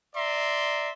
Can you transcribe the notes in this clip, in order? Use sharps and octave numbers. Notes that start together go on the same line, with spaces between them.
D5 E5 A#5 C6